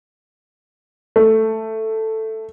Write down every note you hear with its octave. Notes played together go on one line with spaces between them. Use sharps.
A3